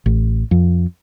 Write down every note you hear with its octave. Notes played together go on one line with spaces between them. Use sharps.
A1
F2